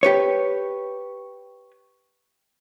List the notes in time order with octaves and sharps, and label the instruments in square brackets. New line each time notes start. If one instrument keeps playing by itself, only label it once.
[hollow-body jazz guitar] G4 B4 C#5